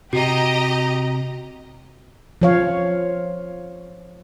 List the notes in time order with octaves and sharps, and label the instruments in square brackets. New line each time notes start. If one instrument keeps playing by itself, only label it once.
[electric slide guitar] C3 [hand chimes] F#4 [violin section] G4 D#5 A#5
[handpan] F3 C#5 F5